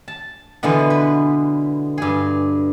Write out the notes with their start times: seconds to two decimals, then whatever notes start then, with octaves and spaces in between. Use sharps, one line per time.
0.08 A5
0.63 B2 D3 E3 G#3 B3
0.90 B4
1.98 G2 G#4